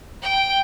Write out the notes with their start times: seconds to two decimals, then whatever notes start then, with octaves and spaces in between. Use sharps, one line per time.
0.22 G5